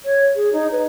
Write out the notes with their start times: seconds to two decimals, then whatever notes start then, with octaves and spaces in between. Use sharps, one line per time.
0.05 C#5
0.35 G#4
0.52 D#4
0.71 B4